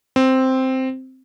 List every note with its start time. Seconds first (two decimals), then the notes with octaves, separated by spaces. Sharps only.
0.16 C4